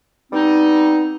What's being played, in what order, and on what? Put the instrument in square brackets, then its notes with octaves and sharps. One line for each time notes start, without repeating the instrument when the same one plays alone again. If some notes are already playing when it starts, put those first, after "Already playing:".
[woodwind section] G3 B3 C4 D#4